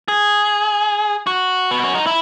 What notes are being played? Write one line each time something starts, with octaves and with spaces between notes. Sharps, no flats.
G#4
F#4
B3
C#4
D#4
E4